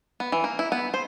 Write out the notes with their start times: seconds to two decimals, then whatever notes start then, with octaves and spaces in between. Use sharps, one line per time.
0.20 B3
0.32 E3
0.44 A#3
0.59 E4
0.72 B3
0.94 C5